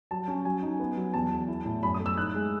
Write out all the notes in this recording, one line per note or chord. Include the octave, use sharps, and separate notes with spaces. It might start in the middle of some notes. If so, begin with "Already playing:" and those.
F#3 A5
C#4
F#3 G#5
D#4
B3
F#3
E2 A5
E2
E4
A2
F#2 B5
D#6
A3
E6
D#4 F#6
G#3